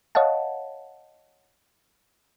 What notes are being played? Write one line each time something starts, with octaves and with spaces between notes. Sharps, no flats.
C#5 D#5 F5 F#5 A5